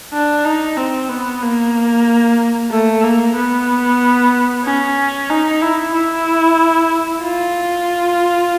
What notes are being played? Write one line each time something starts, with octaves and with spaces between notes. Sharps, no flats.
D4
D#4
C4
B3
A#3
A3
A#3
B3
C#4
D#4
E4
E4
F4